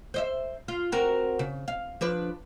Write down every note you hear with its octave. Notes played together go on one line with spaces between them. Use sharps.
C5 D#5 E5
F4
C4 F#4 A#4
C#3
F5
F3 D4 B4